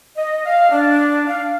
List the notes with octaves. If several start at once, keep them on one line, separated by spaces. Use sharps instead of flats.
D#5
F5
D4
F5